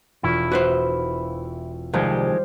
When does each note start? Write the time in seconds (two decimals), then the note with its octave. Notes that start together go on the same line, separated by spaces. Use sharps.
0.23 E1 E4 F4 C#6
0.52 F#4 B4 C5
1.94 C2 D#3 F3 G3 G#3 C5 F5